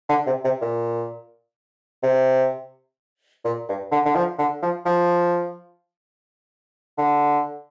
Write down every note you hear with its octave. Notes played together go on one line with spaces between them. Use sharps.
D3
C3
C3
A#2
C3
A#2
G2
D3
D3
F3
D3
F3
F3
D3